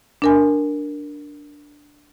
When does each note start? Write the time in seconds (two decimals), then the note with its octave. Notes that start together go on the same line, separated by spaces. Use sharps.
0.22 D4 A#4 G#5